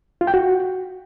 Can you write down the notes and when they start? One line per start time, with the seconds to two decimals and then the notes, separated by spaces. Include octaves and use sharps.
0.21 F4
0.27 G5
0.34 F#4